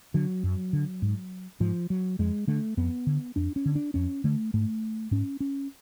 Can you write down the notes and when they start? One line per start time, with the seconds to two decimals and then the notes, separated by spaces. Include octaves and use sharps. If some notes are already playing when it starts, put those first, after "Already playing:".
0.14 D3 F#3
0.43 F#2
0.73 D3
1.02 G#2
1.60 G#2 F3
1.90 F#3
2.19 F2 G#3
2.48 D3 A3
2.77 F2 B3
3.07 D3
3.36 F2 D4
3.56 C#4
3.66 D3
3.75 D4
3.94 F2 C#4
4.24 D3 A3
4.54 G#2 A3
5.11 G#2 C#4
5.40 C#4